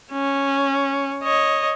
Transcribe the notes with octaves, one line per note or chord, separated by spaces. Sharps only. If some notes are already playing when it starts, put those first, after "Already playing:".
C#4
C#5 D#5